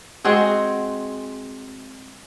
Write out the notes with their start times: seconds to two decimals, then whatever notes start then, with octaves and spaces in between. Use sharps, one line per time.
0.24 G#3 C4 F#4 G#4